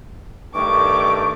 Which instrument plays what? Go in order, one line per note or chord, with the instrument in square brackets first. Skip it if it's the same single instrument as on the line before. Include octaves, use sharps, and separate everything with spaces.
[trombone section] G2 D#3 A3 [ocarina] C#6 [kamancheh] D6